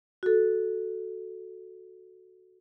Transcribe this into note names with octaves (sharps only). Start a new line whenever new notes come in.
F#4 A4